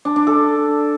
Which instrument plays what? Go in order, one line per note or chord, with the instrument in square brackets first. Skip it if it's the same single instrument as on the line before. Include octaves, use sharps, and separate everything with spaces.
[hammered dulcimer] D4
D4
A4